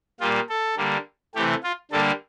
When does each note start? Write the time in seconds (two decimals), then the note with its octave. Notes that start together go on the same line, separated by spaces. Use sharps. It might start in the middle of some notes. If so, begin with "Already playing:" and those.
0.20 A#2 G3 A#3 F4
0.49 A4
0.77 D3 G3 A#3
1.35 C3 E3 A3 G4
1.63 F4
1.91 D3 G3 A#3 A4